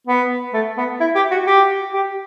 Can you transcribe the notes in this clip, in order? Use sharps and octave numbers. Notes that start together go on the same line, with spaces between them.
B3
A3
B3
E4
G4
F#4
G4
G4